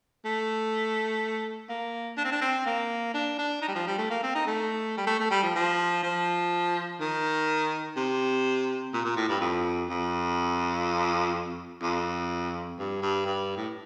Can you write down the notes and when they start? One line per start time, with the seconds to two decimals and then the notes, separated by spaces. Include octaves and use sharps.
0.25 A3
1.69 A#3
2.17 D4
2.24 C4
2.32 D4
2.41 C4
2.66 A#3
3.14 D4
3.38 D4
3.62 D#4
3.68 G3
3.75 F3
3.87 G3
3.98 A3
4.10 A#3
4.23 C4
4.35 D#4
4.46 A3
4.97 G3
5.07 A3
5.19 A3
5.31 G3
5.43 F3
5.55 F3
6.03 F3
7.00 D#3
7.96 C3
8.93 A#2
9.04 A#2
9.16 A2
9.29 G2
9.40 F2
9.89 F2
11.82 F2
12.79 G2
13.02 G2
13.26 G2
13.57 A2